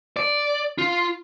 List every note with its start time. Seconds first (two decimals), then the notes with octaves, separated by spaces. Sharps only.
0.17 D5
0.78 F4